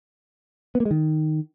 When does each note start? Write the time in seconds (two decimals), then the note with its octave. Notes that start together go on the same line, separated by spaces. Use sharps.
0.75 B3
0.80 A#3
0.85 G#3
0.91 D#3